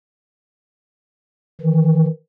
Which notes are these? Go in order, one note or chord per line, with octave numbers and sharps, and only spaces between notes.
D#3 E3